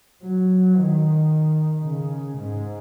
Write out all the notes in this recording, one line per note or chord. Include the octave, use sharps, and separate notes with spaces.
F#3
D#3
C#3
G#2